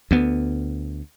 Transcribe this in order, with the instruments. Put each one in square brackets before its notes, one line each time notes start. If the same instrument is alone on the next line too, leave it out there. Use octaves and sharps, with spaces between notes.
[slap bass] D2 B3